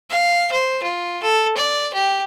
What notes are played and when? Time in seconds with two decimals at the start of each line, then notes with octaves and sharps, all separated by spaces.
0.10 F5
0.52 C5
0.83 F4
1.23 A4
1.57 D5
1.94 G4